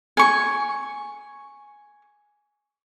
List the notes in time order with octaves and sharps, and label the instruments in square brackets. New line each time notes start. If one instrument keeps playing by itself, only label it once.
[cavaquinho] G#5 C#6